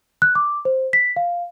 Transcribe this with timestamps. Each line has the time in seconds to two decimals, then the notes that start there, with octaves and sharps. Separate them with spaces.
0.22 F#6
0.35 D6
0.65 C5
0.93 B6
1.16 F5